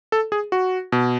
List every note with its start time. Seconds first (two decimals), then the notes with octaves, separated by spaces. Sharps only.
0.12 A4
0.32 G#4
0.52 F#4
0.92 B2